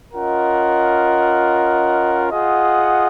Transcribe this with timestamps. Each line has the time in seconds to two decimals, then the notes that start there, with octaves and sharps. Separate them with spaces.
0.14 C#4 F4 A#4 D#5 F#5
2.32 F4 G#4 D#5 F#5